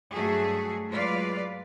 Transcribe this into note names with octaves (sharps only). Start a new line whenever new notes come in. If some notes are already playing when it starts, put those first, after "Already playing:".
G2 F#3 A3 F#4 G#4
F#3 G#3 F4 B4 D5 F5